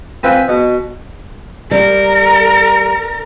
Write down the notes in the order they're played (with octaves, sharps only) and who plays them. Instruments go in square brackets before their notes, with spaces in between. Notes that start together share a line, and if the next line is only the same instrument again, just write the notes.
[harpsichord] C4 F4 B4 G5 G#5
B2
[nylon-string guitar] G3 [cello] A#4